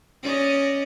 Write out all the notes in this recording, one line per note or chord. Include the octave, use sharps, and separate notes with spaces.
C#4 D5 D#5